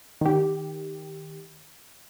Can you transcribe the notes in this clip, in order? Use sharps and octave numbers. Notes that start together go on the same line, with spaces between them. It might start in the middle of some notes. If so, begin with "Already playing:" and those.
D#3 G4